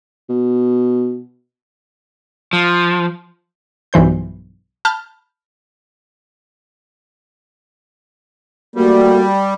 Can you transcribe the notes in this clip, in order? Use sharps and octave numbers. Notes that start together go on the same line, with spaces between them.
B2
F3
B1 G2 E3 C5 G6
A5 B5 F6 G6
G3 A3 A#3 F#4